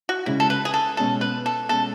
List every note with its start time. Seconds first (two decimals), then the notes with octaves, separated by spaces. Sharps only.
0.09 F#4
0.26 C#3 G#3 C#4 E4
0.40 A4
0.50 B4
0.65 G#4
0.74 A4
0.97 B2 G#3 C#4 A4
1.21 B4
1.46 A4
1.69 B2 G#3 C#4 A4